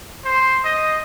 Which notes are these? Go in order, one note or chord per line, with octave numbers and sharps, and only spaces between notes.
C5
D#5